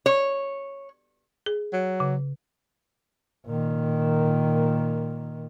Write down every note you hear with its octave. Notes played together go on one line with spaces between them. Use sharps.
C#5
G#4
F#3
C#3
A#2 D#3